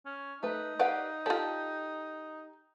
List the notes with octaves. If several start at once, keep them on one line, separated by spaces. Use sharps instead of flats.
C#4
A3 D#4 B4
G4 B4 D5 F5 F#5
F4 G4 A4 D5 A5